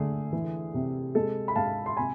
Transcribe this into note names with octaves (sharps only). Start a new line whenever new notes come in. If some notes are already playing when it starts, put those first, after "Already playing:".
Already playing: D3 A3 G#4
E3
C3
G#3 A4
B5
G#2 F5 A5
C6
C3 G#5 B5